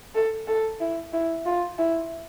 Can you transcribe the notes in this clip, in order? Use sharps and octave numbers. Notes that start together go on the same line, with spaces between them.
A4
A4
E4
E4
F4
E4